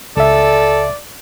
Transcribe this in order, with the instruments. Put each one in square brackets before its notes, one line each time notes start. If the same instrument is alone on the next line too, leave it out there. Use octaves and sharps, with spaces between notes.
[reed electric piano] C#2 E5 [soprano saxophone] A4 [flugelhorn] D5